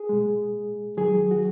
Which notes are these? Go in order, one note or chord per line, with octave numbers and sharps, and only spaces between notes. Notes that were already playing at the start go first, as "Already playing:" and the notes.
Already playing: G#4
A#2 G#3
F#2 D#3 F#3 G#4
F#4